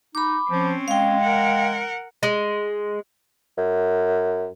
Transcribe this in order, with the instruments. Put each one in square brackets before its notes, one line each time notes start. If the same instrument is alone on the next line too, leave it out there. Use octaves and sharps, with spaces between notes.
[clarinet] D#4 [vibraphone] B5 D6
[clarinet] F3 [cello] C4 C#4
[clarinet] G#3 [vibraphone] F5 G5
[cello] A#4 F#5
[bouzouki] G#3
[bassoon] F#2